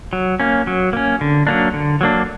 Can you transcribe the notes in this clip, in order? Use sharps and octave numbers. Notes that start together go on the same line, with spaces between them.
F#3
A#3 C#4
F#3
A#3 C#4
D3
F#3 A#3 D4
D3
F#3 A#3 D4